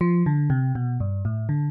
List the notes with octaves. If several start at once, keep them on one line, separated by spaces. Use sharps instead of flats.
F3
D3
C3
B2
G2
A2
D3